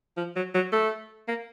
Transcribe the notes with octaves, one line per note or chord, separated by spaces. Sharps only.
F3
F#3
F#3
A3
A#3